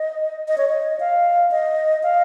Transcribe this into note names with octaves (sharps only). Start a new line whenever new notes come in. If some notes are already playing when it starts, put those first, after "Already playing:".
Already playing: D#5
D#5
C#5
D#5
F5
D#5
F5